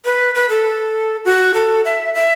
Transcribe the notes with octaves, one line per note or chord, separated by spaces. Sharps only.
B4
B4
A4
F#4
A4
E5
E5